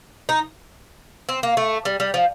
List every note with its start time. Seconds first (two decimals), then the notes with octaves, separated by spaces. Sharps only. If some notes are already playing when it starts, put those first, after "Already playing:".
0.29 D#4
1.29 C4
1.43 A#3
1.57 A3
1.85 G3
2.00 G3
2.14 F3